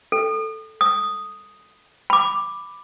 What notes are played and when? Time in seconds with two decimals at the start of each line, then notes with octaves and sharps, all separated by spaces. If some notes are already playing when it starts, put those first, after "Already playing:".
0.12 A4
0.81 D#6
2.10 B5 D6